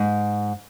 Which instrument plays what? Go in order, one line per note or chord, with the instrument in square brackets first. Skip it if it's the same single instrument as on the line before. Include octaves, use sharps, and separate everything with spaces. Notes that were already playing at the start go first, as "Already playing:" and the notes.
Already playing: [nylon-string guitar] G#2